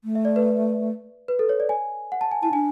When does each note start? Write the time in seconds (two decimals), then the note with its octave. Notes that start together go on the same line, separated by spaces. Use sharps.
0.04 A3
0.15 E5
0.25 D5
0.36 B4
1.28 B4
1.39 A4
1.49 C#5
1.60 D5
1.69 G#5
2.12 F#5
2.21 A5
2.31 G#5
2.43 E4 A5
2.53 D4 G#5